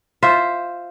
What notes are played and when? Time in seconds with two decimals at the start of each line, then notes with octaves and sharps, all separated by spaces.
0.23 F4 C5 E5